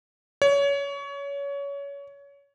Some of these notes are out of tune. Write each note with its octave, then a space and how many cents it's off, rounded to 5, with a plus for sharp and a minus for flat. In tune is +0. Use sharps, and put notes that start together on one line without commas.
C#5 +25